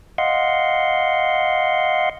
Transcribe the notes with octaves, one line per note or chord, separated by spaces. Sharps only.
D#5 F5 F#5 C6